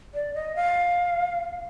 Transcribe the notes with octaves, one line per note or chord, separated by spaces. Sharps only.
D5
D#5
F5